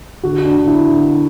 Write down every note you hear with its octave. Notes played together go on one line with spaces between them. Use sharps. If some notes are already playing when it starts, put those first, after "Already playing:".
D3 F#4
D4
D3
E4
D3